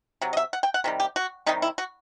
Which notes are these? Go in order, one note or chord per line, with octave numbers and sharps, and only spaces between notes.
C3 F#3
D#5
E5
F#5
G5
F#5
C3 D#3 G3
G4
F#4
C3 D#3 G3 D#4
E4
F#4